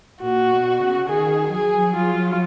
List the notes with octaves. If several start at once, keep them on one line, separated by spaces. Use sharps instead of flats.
A#2 F#4
B2
C#3
D#3 G#4
F#3 G#4
F4